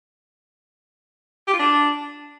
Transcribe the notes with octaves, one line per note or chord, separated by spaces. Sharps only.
G4
F4
D4